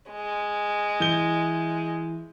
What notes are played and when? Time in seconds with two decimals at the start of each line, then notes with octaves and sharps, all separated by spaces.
0.11 G#3
1.00 E3 G6 G7